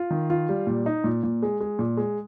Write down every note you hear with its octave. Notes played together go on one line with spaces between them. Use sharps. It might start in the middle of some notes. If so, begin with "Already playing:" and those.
Already playing: F4
D#3
F4
G3
A#2
D#4
A#2
A#2
G#3
G#3
A#2
G#3